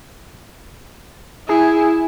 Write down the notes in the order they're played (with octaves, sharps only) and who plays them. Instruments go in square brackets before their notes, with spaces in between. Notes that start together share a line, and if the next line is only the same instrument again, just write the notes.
[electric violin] E4 [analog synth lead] G#4